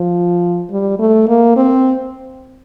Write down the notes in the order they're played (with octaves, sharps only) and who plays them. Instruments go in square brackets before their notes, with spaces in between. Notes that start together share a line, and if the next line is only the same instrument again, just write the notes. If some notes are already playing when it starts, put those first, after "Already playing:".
Already playing: [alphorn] F3
G3
A3
A#3
C4